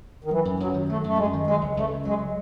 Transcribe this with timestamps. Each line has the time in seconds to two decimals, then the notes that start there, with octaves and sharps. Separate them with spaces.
0.24 D#3
0.31 E3 F#3
0.45 F#2
0.60 F#2 F#3
0.74 D#3
0.89 F#3 A3
1.04 F#2 A3
1.17 F#2 G#3
1.33 D#3
1.47 F#3 G#3
1.61 C#2
1.77 C#2 A3
1.91 C#3
2.05 F#3 G#3